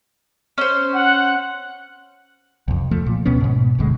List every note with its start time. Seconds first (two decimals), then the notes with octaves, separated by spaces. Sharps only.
0.58 C#4 C5
0.94 F#5
2.68 C2 F2
2.91 F3 A3
3.06 A#2
3.25 C#2 B2 B3 C#4
3.40 G#2 B2
3.78 F#1 D2 B2 G#3